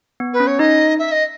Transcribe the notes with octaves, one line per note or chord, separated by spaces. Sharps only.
B3
B4
C#4
C#5
D#4 D#5
E5
D#5